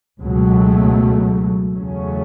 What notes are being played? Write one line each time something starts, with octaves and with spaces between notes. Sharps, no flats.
C#2 B2 F#3 A3
E2 C#3 F#3 A3 C#4